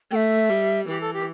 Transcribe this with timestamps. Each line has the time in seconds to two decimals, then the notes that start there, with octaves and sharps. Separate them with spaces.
0.11 A3 E5 G5
0.49 G3
0.88 E3 G4
1.01 A4
1.13 G4